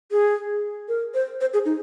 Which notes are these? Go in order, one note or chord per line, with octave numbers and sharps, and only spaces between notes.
G#4
A#4
C5
C5
G#4
D#4